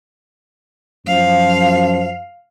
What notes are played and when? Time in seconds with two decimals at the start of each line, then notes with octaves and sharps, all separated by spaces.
1.07 F#2 F3 F5